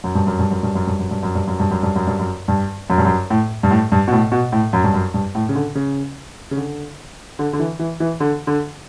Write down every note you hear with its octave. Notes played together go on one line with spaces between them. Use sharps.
F#2
G2
F#2
G2
F#2
G2
F#2
G2
F#2
G2
F#2
G2
F#2
G2
F#2
G2
F#2
G2
F#2
G2
F#2
G2
F#2
A2
G2
A2
G2
B2
A2
B2
A2
F#2
G2
F#2
G2
A2
C#3
D3
C#3
C#3
D3
D3
D3
E3
E3
E3
D3
D3